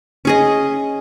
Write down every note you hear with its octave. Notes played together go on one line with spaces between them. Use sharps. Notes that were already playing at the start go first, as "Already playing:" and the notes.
C#4 G#4 D#5